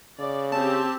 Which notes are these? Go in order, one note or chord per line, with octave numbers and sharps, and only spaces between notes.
C#3 D5
C4 G4 A5